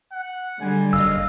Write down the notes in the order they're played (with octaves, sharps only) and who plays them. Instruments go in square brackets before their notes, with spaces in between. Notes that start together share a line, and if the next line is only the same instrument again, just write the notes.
[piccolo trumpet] F#5
[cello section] D3 G3 G#3 [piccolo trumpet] G#5
[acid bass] F#1 [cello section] D#5 [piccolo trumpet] F5 [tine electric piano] E6